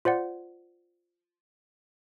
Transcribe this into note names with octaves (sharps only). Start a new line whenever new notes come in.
F4 C5 D5 F#5